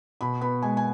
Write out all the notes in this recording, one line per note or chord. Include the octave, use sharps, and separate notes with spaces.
B2 B5
B3 B5
G#3 G#5
G#5